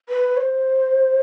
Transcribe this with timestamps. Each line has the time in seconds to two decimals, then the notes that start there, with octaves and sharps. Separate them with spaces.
0.09 B4
0.37 C#5
0.40 C5